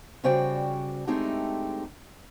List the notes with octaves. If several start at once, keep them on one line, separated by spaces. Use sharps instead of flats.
C#3 G3 F#4 C5 D5 G5
G#3 A3 C4 D4 D#4 G4